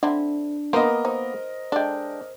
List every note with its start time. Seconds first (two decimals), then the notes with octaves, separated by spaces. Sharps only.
0.03 D3 C4 D4 E4
0.73 A#3 B3 A#4 C5 D#5
1.05 D#4 C5
1.72 G#3 D4 A4 G5